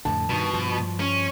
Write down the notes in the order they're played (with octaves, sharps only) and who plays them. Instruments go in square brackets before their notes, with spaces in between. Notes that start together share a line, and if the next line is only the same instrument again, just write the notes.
[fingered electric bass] F2 A2 D3 [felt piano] A5
[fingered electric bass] G2 D#3 [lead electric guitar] B2
[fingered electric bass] G2 F3
[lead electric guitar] C#4